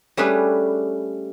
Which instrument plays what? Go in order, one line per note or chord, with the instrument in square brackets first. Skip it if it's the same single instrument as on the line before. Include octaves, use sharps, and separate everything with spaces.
[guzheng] G3 A3 C#4 D4 G#4 B4